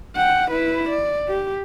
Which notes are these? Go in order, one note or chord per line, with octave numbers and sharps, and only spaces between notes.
F#5 G5
E4 B4
D5
G4